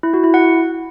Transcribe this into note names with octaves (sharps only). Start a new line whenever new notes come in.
E4
F#4
E4
F#5